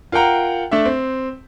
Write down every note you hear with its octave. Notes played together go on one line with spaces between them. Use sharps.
F4 A#4 F#5 G5 A#5
A3 D4 E5
C4